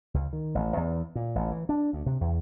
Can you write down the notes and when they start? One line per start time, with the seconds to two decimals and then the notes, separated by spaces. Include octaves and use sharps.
0.14 C#2
0.33 D#3
0.55 A1
0.77 E2
1.15 A#2
1.35 A1
1.51 E3
1.69 D4
1.93 D2
2.06 C3
2.21 E2